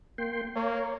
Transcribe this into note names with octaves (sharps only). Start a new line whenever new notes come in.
A#3 G5 C6
A#3 C#5